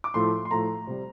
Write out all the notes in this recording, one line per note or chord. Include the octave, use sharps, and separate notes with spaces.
D6
A2 F3 A3 C6
C6
A2 F3 A3 A#5
C3 G3